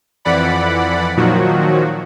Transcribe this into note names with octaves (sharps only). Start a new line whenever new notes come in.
F2 E3 D5 F#5 B5
A#2 D#3 F3 F#3 F#4